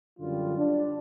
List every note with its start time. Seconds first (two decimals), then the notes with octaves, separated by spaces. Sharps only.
0.18 F#2 D3 G3 F4
0.58 D4